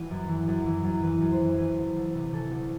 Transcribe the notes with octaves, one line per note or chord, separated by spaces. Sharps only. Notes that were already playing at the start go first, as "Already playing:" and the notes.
Already playing: E3 E4 F#4 B4
F#2
E3
F#2
E3
F#2
E3 B4
F#2
C5
E3
E3 B4
D2
D2
C3 B4
E3 A4
D2